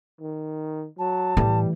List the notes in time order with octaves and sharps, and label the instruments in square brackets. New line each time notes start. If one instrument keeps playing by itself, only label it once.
[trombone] D#3
[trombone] F#3 [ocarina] A5
[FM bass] A2 [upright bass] E3 A3 [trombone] G3